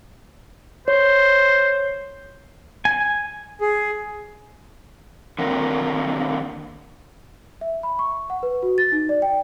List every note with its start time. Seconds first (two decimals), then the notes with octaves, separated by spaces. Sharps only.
0.88 C5 C#5
2.85 G#5
3.61 G#4
5.39 D3 D#3 A#3 C4 A#4
7.61 E5
7.83 B5
7.99 C#6
8.30 F#5
8.43 B4
8.63 F#4
8.78 A6
8.92 D#4
9.09 D5
9.22 G5